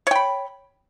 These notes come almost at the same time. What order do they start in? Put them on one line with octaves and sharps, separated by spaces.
C#5 G5 B5